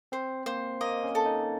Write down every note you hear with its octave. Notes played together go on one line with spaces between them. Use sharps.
C4 C5
A#3 C5
A#3 D#5
C#4
A4
D#4